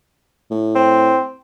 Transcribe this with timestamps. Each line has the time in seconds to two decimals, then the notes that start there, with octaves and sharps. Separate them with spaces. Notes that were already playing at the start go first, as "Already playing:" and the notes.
0.51 A2
0.75 C4